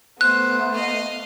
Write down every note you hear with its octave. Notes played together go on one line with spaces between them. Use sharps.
A3 B3 C5 F#6
D#5 F5